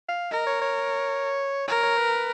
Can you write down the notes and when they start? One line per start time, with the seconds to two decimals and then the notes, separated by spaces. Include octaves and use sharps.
0.09 F5
0.31 A#4 D#5
0.47 C#5
0.62 C#5
1.68 A#4 C#5
1.83 C#5
1.98 B4